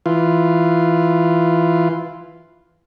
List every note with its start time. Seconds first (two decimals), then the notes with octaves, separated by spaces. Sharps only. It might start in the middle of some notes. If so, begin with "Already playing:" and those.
0.06 E3 F4